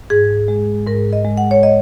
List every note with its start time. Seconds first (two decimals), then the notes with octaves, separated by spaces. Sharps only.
0.10 G#2 G#4
0.48 G#3
0.87 G#2 A#4
1.13 D#5
1.25 G#3
1.37 F#5
1.51 C#5
1.63 D#5